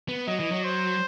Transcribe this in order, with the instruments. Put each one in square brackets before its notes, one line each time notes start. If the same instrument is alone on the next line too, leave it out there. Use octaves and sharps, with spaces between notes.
[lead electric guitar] B3
[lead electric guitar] F#3 [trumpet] D#5
[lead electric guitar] E3
F#3
[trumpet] C5